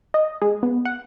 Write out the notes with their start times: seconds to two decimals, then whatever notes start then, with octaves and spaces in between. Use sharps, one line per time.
0.14 D#5
0.42 G#3
0.63 B3
0.85 F#5